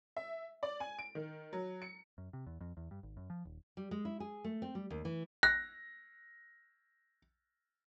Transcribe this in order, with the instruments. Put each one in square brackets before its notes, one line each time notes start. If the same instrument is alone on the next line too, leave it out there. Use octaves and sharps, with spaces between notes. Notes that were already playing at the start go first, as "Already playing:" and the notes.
[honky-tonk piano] E5
D5
G#5
D7
D#3
F#3
C#7
[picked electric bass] F#2
C3
E2
F2
E2
G2
G#1
F#2
F3
D#1
[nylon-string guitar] G3
G#3
E4
G#4
A3
C4
G3
D#2
E3
[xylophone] F#6 [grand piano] A#6